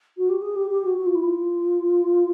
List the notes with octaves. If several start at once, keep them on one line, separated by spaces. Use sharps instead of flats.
F#4
G4
G#4
G4
G4
F#4
F#4
F4
E4
F4